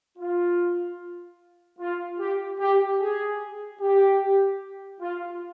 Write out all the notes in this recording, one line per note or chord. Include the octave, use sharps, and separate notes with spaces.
F4
F4
G4
G4
G#4
G4
F4